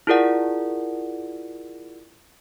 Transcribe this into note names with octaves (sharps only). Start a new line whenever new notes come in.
E4 F4 G#4 A#4 D5 F#5